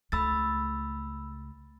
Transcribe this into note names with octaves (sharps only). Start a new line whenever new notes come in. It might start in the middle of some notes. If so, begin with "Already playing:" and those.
C#2 A3 B5 E6 A6